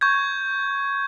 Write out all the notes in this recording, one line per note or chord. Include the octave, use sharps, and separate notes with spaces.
C#6 G6 G#6